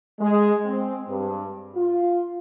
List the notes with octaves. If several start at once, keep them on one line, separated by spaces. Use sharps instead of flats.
G#3
C4
G2
F4